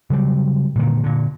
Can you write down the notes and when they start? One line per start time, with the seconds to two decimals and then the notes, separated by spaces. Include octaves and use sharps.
0.10 C#3 F#3 G3
0.75 A#2 D3 D#3
1.04 A#2 D3